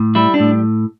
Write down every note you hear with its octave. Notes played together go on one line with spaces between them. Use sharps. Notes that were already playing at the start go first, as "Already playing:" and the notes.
Already playing: A2
G3 E4
D4
A2